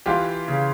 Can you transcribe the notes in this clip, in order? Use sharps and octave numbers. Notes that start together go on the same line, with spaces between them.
E3 F4 G4
C#3